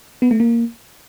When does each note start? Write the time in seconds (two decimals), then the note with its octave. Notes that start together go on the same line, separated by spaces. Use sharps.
0.22 B3
0.31 A3
0.40 A#3